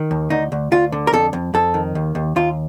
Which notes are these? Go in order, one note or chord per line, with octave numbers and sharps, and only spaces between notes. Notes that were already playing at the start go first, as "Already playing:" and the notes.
Already playing: D#3
D#2
D2 D#4
D2
D2 F4
D3
A#4
F2 A4
F2
F2 A4
D#3
D#2
D#2
D#2 F4